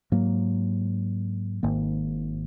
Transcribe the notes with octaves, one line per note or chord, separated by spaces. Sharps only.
G#2 F#3 A#3
G#1 G#2 D#3 A#3